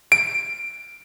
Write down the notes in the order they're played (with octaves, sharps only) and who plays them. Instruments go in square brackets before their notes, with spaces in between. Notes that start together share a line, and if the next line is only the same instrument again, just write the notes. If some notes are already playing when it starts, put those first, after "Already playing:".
[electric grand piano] D7